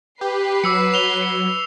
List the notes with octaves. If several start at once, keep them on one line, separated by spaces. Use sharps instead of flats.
G4 B4 C7
F#3 D6 E6 C#7
F7 G7
C#7